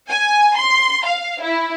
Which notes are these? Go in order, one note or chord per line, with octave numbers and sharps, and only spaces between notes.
G#5
C6
F5
E4